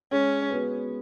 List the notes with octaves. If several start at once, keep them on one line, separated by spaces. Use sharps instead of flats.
G#3 C#4
B3 F#4 B4